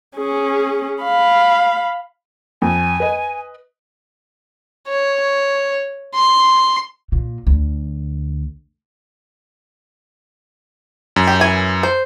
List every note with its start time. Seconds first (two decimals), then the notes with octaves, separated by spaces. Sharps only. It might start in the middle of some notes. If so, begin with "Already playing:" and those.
0.17 C#4 G#4
1.03 F5 B5
2.62 F2 G#5
3.00 B4 D#5
4.88 C#5
6.15 C6
7.12 A#2
7.47 D2
11.16 F#2
11.27 G4
11.40 E3 G#5
11.83 C5